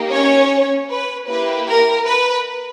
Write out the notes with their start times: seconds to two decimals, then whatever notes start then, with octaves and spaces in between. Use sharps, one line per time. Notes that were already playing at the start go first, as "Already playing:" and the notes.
Already playing: A#3 D#4 G4
0.10 C#4 C#5
0.89 B4
1.27 A#3 E4 G4 B4
1.66 A#4
2.06 B4